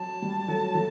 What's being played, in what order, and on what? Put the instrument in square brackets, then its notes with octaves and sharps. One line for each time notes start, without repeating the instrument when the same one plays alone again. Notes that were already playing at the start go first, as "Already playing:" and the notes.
Already playing: [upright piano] F#3 [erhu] A5
[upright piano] G3
F#3 A3
F#3 A3